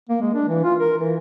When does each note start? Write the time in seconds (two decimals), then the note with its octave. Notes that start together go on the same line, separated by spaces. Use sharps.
0.09 A#3
0.22 G#3
0.35 D4
0.48 E3
0.65 F4
0.80 A#4
0.98 E3